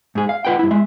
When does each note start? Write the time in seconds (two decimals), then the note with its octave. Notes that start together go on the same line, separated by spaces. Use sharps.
0.15 G#2 G#4
0.29 F5
0.45 F4 B4 F#5 G5
0.59 G2 E4
0.71 G#3 E5